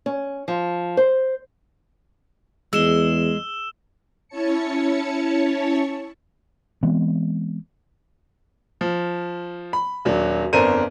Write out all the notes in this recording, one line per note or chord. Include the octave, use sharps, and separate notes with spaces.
C#4
F3
C5
E2 G#3 E6 E7 G7
C#4 E4 C#5 A5 C#7
E3 G#3 B3 C4
F3
B5
D#1 F#3 D4
G1 F2 D4 A#4 C5 D#7